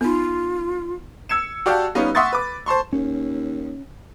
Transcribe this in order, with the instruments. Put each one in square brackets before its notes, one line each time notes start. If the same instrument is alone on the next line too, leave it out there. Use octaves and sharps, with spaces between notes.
[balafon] B3 D#4 [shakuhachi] F4
[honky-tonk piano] E6 G#6 C#7 E7
F#4 G4 D5 F5 G5 A5
G3 B3 C#4 D#4 F4
E5 F#5 C6 C#6 D#6 A6
B4 D6
C5 A5 C6 C#6
[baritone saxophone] D#2 [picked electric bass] C#4